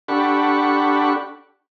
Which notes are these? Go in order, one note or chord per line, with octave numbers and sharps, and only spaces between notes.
D4 G4 A4 F#5 B5 C#6